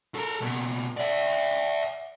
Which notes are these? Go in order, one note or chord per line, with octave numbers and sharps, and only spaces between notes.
A4 A#4
B2 A#3
D5 E5